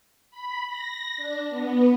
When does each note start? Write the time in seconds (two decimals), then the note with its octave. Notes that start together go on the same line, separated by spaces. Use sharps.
0.31 B5
0.67 A#6
1.17 D4
1.50 B3